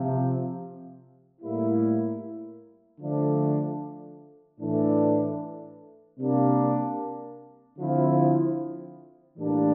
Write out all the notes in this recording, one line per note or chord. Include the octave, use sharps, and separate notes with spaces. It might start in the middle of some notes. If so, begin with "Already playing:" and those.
Already playing: C3 F3 C4
A2 G3 A#3 E4
D3 F3 A3 D4
A2 E3 A3 D4
C3 G3 A#3 D4
D3 F3 C4 E4
A2 E3 G3 A#3 D4